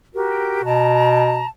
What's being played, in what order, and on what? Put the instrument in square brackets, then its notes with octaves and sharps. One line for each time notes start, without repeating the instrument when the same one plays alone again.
[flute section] F#4 G4 A#4
[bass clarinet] B2 [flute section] A5 A#5